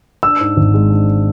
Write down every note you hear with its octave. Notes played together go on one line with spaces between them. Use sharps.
D4 E6
G#2
G#1
G#3
D4